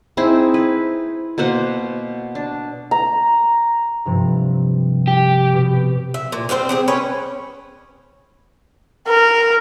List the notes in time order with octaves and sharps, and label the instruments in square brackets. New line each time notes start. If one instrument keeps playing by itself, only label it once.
[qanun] C4 D#4 E4 G#4
B4
B2 A#3 C5 F#5
D4
[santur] A#5
[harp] G2 C3 F3
[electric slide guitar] G4
[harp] B2
[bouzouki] E5
A#2
G3 C4 F#4 C5
C4 G4 G#4
C#4 B4 C#5
[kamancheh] A#4